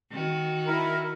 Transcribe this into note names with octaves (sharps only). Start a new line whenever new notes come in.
D#3 F#4
E4 A#4